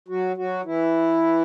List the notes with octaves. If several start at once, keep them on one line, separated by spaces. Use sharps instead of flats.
F#3 F#4
F#3 F#4
E3 E4